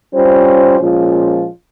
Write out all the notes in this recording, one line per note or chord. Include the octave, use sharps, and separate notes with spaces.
G3 C#4 F4 C5
A#2 F3 G#3 C#4 F4